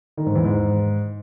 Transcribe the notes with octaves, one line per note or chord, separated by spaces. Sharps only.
D#3
G#2
E2
G#2